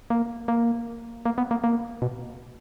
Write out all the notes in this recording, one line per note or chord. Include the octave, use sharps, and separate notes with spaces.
A#3
A#3
A#3
B3
A#3
A#3
B2